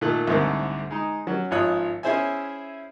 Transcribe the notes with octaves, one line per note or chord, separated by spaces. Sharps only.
A#2 D#3 A3 F#6
C2 G#2 D3 E3 A3 C4
G#3 D#4
F#3 C#4 F#4
G#1 F3 F4 C#5 D#6 F#6
C#4 E4 G#4 C5 E5 G#5